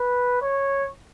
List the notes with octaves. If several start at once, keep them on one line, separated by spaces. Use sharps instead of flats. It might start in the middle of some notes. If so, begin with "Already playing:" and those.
Already playing: B4
C#5